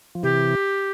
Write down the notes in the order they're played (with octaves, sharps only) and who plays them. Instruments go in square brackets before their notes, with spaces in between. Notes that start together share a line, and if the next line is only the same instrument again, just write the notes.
[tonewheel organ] F3
[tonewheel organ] C3 E3 [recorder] G4